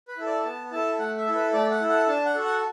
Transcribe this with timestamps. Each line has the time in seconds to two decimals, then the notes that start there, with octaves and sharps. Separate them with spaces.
0.08 B4
0.17 E4 A4
0.26 D5
0.44 B3 A5
0.72 E4 A4 A5
0.99 A3 F#5
1.17 E5
1.26 E4 A4
1.35 B4
1.53 A3 D5
1.71 F#5
1.80 E4 A4
1.89 F#5
2.08 D4 A5
2.26 F#5
2.35 F#4 A4
2.44 F#5